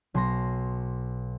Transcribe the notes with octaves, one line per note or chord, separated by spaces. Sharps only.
B1 C6 A#6